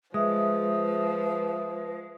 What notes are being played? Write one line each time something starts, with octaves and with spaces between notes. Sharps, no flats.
F3 G#3 B4 E5 D#6